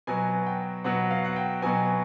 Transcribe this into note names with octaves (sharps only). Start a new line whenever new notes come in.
B2 F#3 B3 G#5
G5
B2 F#3 B3 F#5
F5
F#5
G5
B2 F#3 B3 G#5